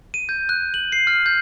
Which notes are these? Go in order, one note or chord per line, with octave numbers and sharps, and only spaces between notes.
D#7
G6
F#6
F#7
C7
F6
G6